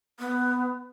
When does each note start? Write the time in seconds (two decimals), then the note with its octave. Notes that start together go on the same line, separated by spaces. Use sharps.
0.19 B3